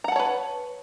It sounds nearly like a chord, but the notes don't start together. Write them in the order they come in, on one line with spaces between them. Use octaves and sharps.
A#5 F#5 A5 C#5 B4